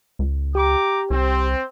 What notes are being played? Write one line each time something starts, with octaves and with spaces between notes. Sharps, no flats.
C#2
G4 G5 A#5 D6
C2 C4